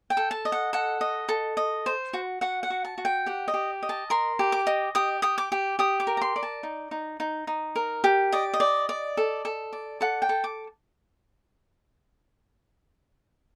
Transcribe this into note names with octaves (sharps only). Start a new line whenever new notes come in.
G5
A4
A5
D#5
F#5
A4 F#5
D#5
A4
D#5
C5
F#4
F#4 F#5
F#5
F#4
A5
F#4
G5
G4 F#5
D#5
G4
D#5
A5
A#4 C6
G4
D6
D#5
G4 D#6
G4 D#6
D6
G4
G4 D#6
D6
A#4
A#5
C6
D5
A5
D#4
D#4
D#4
D#4
A#4
G4
D5 D#5
D#5
D5
D5
A4
A4
D5
A4 F#5
G5
A4
D6